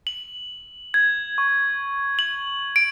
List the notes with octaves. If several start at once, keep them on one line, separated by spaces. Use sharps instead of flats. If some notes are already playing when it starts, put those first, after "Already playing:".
F#7
G#6
C#6
F#7
D7